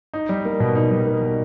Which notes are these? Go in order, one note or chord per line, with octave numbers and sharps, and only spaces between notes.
D#4
G3
A#3
B2
D#4
G3
A#3
B2